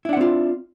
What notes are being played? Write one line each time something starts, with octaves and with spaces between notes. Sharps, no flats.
C4 D4 E4 F4 F#5